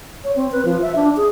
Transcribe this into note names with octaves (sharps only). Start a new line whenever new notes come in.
C#5
C4
B4
F3
E5
D4
G#4